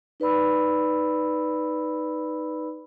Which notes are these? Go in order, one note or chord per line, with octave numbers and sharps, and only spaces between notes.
D#4 B4 D5 B5 E6